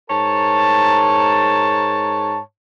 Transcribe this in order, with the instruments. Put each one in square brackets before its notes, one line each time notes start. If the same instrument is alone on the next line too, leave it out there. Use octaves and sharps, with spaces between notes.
[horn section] G#2 A#4 C#5 A5